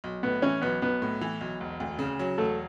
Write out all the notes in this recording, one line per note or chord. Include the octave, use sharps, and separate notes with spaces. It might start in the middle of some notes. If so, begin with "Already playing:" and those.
B1
A2 B3
E3 C#4
B1 B3
B1 B3
A2
E3
B1
E1
D2
C#3
F#3
E1 A3